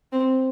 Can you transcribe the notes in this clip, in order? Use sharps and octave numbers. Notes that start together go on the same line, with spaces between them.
C4